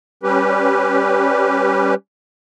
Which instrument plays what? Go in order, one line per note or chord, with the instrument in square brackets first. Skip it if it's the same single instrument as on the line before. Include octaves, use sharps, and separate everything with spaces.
[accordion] G3 C#4 G4 B4